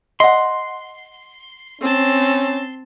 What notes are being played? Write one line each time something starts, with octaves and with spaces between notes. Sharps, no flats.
D#5 F#5 C6
C4 C#4 A5